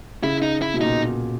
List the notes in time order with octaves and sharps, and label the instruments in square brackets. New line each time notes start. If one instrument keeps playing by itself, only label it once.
[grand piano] C#3 [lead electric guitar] E4
[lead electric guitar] D#4
E4
[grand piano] B2
[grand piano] A#2 [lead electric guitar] D#4